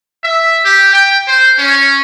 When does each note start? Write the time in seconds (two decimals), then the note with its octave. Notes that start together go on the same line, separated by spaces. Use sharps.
0.24 E5
0.64 G4
0.94 G5
1.28 C5
1.59 C#4